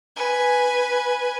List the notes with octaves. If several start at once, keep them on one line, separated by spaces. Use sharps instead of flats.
B4 G#5